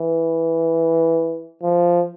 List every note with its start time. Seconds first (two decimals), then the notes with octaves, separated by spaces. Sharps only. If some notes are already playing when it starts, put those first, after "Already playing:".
Already playing: E3
1.63 F3